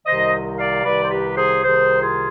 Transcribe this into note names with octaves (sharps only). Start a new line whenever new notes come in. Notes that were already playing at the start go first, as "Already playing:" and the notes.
C2 C3 D#3 C5 D#5
D5 F5
C2 C3 D#3 B4 D5
C5
G4 B4
G#4 C5
C2 C3 D#3 G#4 C5
F4 G#4